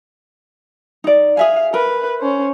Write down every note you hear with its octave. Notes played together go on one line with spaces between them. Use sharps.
D#4 D5
G#4 E5 F5 G#5
A#4 B4
C#4 C5